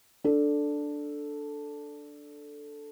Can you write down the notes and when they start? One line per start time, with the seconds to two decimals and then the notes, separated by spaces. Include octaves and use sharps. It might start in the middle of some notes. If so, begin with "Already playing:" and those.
0.24 D4 A4